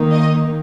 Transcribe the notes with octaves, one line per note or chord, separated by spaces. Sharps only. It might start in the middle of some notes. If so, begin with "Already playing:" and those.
Already playing: D#3 A#3 D#4
D#5